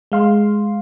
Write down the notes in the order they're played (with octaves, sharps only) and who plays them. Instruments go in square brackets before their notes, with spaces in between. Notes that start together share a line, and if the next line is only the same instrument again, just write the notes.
[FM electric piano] G#3 F5 C6